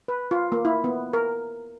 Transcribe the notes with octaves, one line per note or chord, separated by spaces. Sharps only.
B4
F4
A#3
E4
B3
A#4